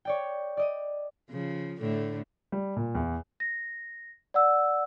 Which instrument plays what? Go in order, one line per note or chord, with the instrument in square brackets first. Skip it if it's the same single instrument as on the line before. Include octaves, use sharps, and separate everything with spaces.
[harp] C#5 D5 G5
D5 D#5 D#7
[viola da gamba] C#3 F3
A2 D3 A3
[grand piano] G3
A#2
E2
[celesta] A#6
D5 F#5 E6